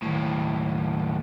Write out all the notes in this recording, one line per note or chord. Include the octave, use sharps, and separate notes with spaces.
D#2 A2